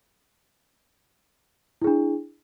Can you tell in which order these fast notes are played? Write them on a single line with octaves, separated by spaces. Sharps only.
E4 G#4 D4